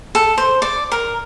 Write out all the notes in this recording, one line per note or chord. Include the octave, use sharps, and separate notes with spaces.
A4
C5
D5
A#4